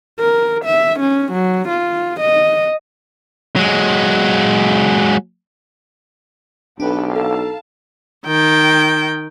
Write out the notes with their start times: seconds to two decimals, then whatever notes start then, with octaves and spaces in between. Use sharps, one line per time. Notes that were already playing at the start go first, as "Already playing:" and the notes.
0.19 A#4
0.65 E5
1.00 C#4
1.32 F#3
1.69 F4
2.20 D#5
3.56 F#3 G#3
6.80 B1 D4 G4 A4 B4
7.14 D#4 A4 F5 A5
8.26 D#3 G5